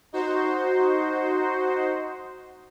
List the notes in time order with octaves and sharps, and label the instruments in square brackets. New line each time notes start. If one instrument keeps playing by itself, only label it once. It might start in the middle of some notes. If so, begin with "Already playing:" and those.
[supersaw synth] D#4 F#4 C5